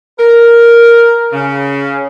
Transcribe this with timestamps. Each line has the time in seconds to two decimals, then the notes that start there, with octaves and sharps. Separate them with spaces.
0.19 A#4
1.32 C#3